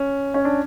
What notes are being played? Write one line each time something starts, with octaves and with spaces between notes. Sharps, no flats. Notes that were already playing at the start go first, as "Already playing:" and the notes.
Already playing: C#4
C#4
D4